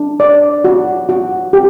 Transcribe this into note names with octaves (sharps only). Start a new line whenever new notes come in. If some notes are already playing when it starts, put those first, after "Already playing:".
Already playing: D4
D5
F#4
F#4
G4